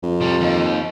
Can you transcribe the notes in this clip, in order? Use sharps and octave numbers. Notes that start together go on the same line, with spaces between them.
F2
C3 G3
D#2